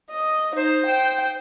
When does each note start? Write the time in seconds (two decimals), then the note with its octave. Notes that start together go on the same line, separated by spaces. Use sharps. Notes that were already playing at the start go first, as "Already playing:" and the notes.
0.11 D#5
0.56 D#4 C5
0.86 G5